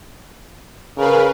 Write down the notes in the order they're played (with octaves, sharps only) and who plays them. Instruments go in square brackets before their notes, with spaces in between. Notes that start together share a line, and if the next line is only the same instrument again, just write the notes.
[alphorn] C#3 [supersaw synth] A#4 B4 F5